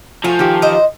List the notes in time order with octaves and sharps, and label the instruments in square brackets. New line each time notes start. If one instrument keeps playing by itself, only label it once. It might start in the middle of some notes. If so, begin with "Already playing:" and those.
[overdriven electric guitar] F3 [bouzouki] A3 F4 G#5 [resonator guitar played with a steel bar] F#4
[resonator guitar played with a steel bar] D#3 G4
[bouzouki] E3 C5 D#5